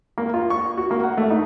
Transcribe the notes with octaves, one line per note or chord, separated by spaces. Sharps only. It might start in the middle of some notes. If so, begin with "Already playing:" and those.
A#3
F4
C#6
F#4
A#3
F#5
A3
D#4